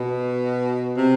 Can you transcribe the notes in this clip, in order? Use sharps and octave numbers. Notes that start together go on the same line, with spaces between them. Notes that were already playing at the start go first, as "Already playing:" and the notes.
Already playing: B2
C3